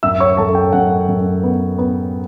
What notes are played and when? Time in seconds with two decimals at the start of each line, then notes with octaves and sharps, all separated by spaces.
0.03 F#2 E5 E6
0.20 C#5 C#6
0.37 F#2 A4 A5
0.55 G5
0.73 F#2 F#5
1.08 F#2
1.44 B3
1.78 B3